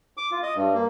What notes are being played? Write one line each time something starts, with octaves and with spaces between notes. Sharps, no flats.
D6
F4
D#5
G2
A#3